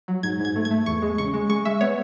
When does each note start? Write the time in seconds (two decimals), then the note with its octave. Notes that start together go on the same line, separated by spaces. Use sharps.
0.08 F#3
0.23 G#2 G#6
0.40 G#2
0.45 G#6
0.56 A3
0.65 G#6
0.71 A3
0.86 E2 C#6
1.02 G#3
1.18 C#3 C#6
1.34 G#3
1.50 G#3 C#6
1.65 G#3 E5
1.81 B3 C#5